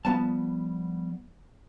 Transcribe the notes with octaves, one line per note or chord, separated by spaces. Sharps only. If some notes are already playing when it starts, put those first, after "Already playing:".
F3 G3 B3 A5